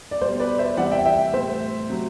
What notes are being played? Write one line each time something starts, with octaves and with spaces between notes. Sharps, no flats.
D5
B2 G3 C5
B4 D5
C5 E5
C3 E3 G3 D5 F#5
E5 G5
E5 G5
A2 G3 C5 E5
C3 F#3